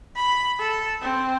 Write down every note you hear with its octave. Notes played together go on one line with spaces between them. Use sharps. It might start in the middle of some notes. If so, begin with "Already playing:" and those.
B5
A4
C4